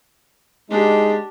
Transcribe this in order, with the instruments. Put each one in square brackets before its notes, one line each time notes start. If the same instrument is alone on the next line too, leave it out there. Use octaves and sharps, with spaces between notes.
[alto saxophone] G#3 [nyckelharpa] D4 G4 [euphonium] D#4